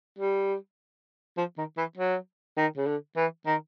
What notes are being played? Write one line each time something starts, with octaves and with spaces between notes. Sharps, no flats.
G3
F3
D#3
E3
F#3
D#3
C#3
D3
E3
D#3